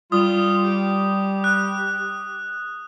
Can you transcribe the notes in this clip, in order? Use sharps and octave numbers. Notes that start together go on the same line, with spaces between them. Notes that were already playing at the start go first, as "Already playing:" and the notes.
G3 F4 D#6
G4
F#6